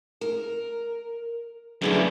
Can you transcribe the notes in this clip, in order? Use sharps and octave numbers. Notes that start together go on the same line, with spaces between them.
A#4
F#2 D3 E4 G#4 B4